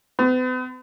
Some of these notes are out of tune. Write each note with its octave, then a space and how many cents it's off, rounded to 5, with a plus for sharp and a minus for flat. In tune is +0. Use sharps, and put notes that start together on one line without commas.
B3 +45